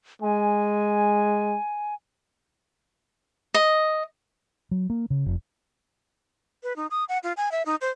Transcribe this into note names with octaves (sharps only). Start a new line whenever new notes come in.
G#3 G#5
D#5
F#3
A#3
C#3
F1
B4
D#4
D#6
F#5
F4
G#5
E5
D#4
C5